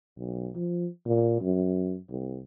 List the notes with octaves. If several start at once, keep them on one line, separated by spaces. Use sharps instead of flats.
B1
F3
A#2
F#2
C2